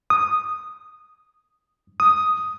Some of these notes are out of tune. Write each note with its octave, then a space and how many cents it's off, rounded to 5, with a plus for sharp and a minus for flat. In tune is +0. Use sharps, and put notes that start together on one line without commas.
D#6 -5
D#6 +5